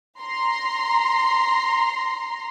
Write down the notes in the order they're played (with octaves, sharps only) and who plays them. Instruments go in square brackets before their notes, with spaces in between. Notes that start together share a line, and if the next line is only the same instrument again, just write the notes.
[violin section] A#5 C6